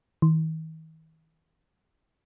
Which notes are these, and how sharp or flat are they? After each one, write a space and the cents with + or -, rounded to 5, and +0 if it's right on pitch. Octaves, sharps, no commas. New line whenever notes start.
D#3 +45